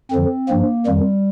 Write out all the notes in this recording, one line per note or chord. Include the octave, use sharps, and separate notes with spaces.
F2 D3 F3 C4
G2 F3 A#3
F2 D#3 G3